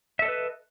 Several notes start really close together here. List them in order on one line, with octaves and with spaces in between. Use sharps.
E5 A4 D#5 B4